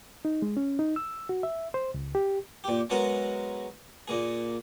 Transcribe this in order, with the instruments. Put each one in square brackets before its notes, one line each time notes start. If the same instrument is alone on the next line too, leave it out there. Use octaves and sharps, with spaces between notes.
[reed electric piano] D#4
G#3
C#4
D#4
E6
F#4
E5
C5
C#2
G4
[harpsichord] A#2 G4
F#3 G#3 B3 F#4 A#4
A#2 A#3 G#4